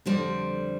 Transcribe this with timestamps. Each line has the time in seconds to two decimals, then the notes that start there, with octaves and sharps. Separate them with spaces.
0.06 F2 D3 G3 C5